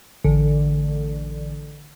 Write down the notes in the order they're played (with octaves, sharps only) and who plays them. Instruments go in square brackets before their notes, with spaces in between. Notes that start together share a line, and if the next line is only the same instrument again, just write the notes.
[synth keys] A1 D3